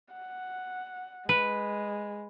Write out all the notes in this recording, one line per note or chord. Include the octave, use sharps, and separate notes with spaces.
F#5
G#3 B4